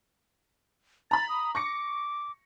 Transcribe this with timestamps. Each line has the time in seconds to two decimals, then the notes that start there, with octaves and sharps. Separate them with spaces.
1.11 A#5 B5 A6
1.29 D#6
1.55 C#6 D6 A#6 C#7